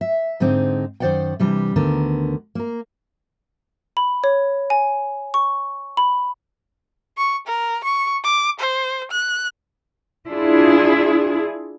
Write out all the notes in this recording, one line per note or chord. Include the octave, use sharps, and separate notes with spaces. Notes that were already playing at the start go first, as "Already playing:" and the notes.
E5
G#2 D3 G#3 C4 D#4
F#2 D#3 C5 D5 F#5 G5
C3 E3 G3 D4
D2 D3 D#3 B3 A#4
A#3 A#4
B5
C#5
G#5
C#6
B5
C#6
A#4
C#6
D6
C5
F#6
D4 E4 F4 G#4